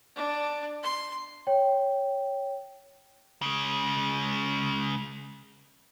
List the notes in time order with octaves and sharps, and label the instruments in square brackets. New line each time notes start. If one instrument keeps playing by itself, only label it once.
[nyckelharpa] D4
C6
[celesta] C#5 G5
[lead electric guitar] C#3 G#3